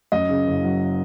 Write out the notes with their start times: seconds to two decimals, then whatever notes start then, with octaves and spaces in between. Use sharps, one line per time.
0.12 F#2 D#5
0.29 C#3
0.47 F#1
0.64 F#3